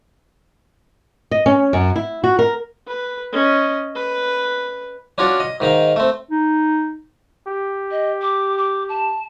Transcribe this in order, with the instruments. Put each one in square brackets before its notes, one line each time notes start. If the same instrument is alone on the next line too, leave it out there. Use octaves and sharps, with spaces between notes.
[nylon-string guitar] D#5
C#4
F#2
E4
F#4
A#4
[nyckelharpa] B4
C#4 D#5
B4
[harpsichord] C#4 D4 F4 F#4 C#5 D5
D#5
G#2 D#3 D#4 F5
A3 C4
[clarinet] D#4
[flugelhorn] G4
[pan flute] D#5
D6
D6
A5